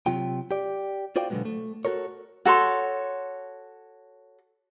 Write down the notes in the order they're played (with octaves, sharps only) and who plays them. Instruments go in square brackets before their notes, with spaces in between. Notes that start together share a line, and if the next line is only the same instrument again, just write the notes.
[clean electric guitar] C3 F#3 F4 G5
G4 D5
F4 F#4 C5 D5 F5 G5
B2 D3 D#3 F#3 G#3 B3
A3
F#4 G4 A4 A#4 C#5
[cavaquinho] F#4 A4 C#5 C6